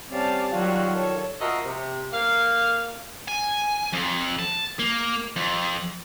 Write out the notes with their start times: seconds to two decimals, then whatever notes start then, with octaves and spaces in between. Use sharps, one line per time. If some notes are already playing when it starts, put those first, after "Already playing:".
0.10 G3 C4 C#4 D5 F5 A5
0.52 D#3 F#3 G3 F4 F5
0.91 A4 C#5
1.40 F3 F#4 A#4 D#5 E5
1.64 C3
2.12 A#3 F5
3.28 G#5
3.93 F2
4.39 A5
4.79 A#3
5.36 F2